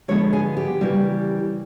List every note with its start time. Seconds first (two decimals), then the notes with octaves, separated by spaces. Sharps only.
0.08 D3 F3 G#3 B3 C#5
0.33 G#4
0.57 G4
0.81 C#3 E3 G3 A#3